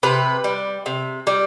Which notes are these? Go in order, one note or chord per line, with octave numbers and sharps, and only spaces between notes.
C3 B4
G3
C3
G3